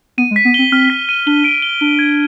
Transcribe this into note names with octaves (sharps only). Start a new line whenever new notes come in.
B3 D#7
G#3
B6
B3
C4 G7
C4 F6
B6
D#7
D4 G7
D7
G7
D4 G7
G#6